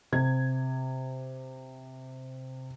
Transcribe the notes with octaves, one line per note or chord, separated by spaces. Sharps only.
C3 G#6